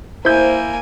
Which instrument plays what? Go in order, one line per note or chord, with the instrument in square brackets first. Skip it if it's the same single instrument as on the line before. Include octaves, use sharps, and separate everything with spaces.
[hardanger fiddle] A#3 G#5 [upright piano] E4 G6 [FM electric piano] C5